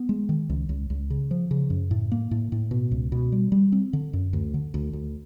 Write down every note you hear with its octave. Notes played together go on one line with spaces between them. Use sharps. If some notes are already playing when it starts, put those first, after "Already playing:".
Already playing: B3
G#3
D#3
C#2
C#2
C#2
C#3
F3
C#3
F#2
A2
A#3
A2
A2
B2
C#2
B2
G3
G3
C4
D3
F#2
D2
D3
D2
D2